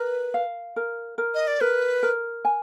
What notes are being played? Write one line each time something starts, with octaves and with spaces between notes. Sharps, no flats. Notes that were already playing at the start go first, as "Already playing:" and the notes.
Already playing: A#4 B4
F5
A#4
A#4
D#5
D5
A#4 B4
A#4
G#5